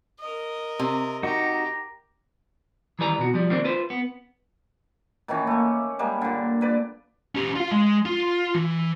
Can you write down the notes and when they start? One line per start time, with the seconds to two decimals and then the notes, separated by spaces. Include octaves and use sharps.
0.20 A#4 D#5
0.79 C3
1.23 D#4 F#4 G4 A#5
2.99 D#3 E3 G3 B4 G#5 A#5
3.19 B2 F#4
3.34 F3 G3
3.50 D#3 A#3 C4 D4
3.65 F4 B4 C5
3.90 B3
5.28 A#2 D#3 E3 C#4
5.47 A3 A#3
5.99 G3 G#3 A#3
6.21 A#2 D3
6.61 A#2 B4 D5
7.35 C#4 G4
7.56 F4 F5
7.72 G#3
8.05 F4
8.55 E3